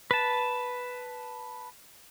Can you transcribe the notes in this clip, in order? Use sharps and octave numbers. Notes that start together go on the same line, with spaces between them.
B4 A5